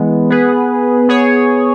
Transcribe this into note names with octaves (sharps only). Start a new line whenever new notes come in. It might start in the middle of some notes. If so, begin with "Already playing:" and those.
Already playing: E3 G#3 B3
B3 G#4 B4
B3 G#4 C#5